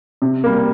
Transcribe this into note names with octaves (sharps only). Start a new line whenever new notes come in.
C3
G3 A#3